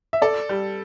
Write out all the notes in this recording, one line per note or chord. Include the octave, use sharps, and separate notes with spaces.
E5
A4 D5
G3